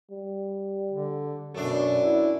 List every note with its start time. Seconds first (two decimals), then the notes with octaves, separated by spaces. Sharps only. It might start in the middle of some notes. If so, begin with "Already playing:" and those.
0.10 G3
0.92 D3
1.54 F#2 B2 A3 D4
2.03 E4